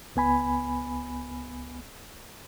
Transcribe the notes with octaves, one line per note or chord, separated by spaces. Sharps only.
C#2 B3 G#5 B5